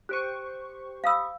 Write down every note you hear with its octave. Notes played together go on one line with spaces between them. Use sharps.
G4 C5 C#6 F#6 D7 D#7
F5 B5 D#6 E6 B6